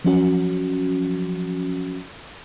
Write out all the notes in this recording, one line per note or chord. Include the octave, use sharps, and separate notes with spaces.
F3 F#3 C#4 F#4